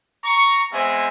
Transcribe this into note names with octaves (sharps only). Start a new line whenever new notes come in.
A#5 C#6
G#3 B3 C4 E5 G#5